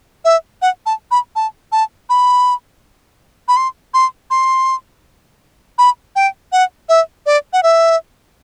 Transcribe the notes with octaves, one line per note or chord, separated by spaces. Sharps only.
E5
F#5
A5
B5
A5
A5
B5
B5
C6
C6
C6
B5
G5
F#5
E5
D5
F#5
E5